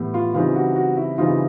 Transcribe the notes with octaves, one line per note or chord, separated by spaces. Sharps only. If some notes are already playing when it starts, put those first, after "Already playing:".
Already playing: A2 E3 G3 B3
F4
C#3 E3 G3 C4 D#4 F4
F#4
F#4
E4
C#3 E3 G3 C4 D#4 F4